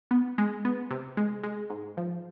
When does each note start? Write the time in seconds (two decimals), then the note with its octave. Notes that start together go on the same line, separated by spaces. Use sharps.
0.11 B3
0.38 G#3
0.65 B3
0.91 C3
1.17 G#3
1.44 G#3
1.70 G#2
1.97 F3